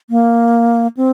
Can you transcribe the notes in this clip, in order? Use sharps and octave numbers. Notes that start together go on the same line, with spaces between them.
A#3
C4